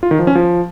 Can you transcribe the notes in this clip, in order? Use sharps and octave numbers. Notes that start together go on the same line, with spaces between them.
F4
D#3
F3
C#4
F3